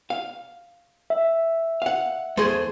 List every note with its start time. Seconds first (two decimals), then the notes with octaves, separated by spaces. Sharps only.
0.10 F5
1.10 E5
1.82 F5 F#5
2.37 E2 G#2 A3 G#4 C5